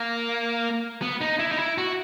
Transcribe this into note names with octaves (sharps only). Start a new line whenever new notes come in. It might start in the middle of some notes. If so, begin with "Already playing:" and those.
Already playing: A#3
B3
D#4
E4
D#4
E4
F#4